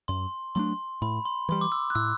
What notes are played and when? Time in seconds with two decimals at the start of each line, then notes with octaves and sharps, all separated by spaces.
0.08 F#2 C6
0.55 F#3 A3 D4 C6
1.02 A2 B5
1.25 C6
1.49 E3 G3 C6
1.61 D6
1.72 E6
1.90 F#6
1.95 A2 E6